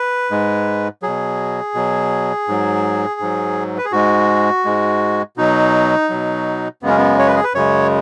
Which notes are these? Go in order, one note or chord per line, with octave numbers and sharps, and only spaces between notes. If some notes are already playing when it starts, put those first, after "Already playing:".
Already playing: B4
G#2 G#3
B2 F#3 G#4
B2 F#3
G#2 F#3
G#2 F#3
B4
G#4
G#2 G#3 F#4
G#2 G#3
B2 F#3 D#4
B2 F#3
F#2 C#3 G#3 B3
C#4
B3
C#5
B4
G#4
B4
F#2 C#3 G#3 C#5